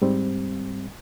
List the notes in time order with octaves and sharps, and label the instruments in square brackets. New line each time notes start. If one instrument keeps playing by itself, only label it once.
[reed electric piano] G#2 G3 C4